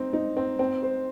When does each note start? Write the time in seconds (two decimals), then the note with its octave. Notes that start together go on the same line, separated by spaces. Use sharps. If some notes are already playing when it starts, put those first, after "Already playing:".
Already playing: C4 D#4
0.13 D#4
0.37 C4
0.59 C4
0.82 C5